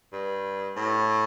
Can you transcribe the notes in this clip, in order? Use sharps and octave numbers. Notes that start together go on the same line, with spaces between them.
G2
A2